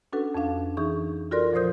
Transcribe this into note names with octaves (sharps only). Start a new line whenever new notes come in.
C#4 D4 F#4 A4 B4 F#5
F2 C#4 D4 F5
E3 D#4 G#4 C#6 G6
F4 F#4 A4 A#4 D5 C6
A#2 F3 A#4 C5 D#6 G6